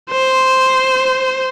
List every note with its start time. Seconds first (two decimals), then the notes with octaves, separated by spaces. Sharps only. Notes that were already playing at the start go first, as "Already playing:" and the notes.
0.11 C5